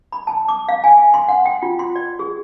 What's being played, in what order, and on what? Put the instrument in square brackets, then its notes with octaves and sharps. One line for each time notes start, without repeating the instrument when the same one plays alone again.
[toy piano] B5
A5
D6
F5
G#5
C6
F#5
G5
F4
C6
D5
G#4